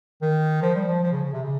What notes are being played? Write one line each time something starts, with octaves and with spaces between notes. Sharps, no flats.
D#3
F3
G3
F3
F3
C#3
C#3
C3
C#3